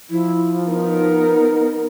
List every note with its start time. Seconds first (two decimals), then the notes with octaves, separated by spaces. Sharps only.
0.10 F3 E4
0.67 B3 D#4 A#4